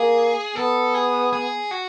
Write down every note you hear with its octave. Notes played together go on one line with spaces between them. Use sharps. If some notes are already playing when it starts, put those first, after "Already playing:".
Already playing: A#3 G#4
B3 A4
G#4
G#4
F#4